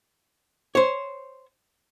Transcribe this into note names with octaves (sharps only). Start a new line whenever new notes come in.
C5 C#5